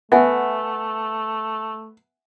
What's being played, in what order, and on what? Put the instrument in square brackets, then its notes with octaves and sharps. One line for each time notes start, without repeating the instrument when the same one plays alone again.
[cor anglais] A3 [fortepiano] B3 [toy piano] E5 F#5 G#5